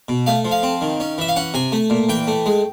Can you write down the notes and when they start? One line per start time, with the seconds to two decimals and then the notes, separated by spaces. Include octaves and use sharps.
0.09 B2
0.26 A3 F5
0.45 F3
0.51 F5
0.63 C4
0.81 D#3
1.00 C#4
1.18 E3 E5
1.28 F5
1.36 C#4 F#5
1.54 C3 G#5
1.72 A3
1.90 A#2
2.09 E3 G5
2.27 A3
2.46 G#3